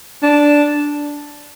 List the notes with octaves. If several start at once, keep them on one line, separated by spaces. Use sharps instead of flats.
D4